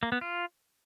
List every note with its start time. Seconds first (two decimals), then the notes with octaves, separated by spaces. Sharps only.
0.03 A#3
0.12 B3
0.21 F4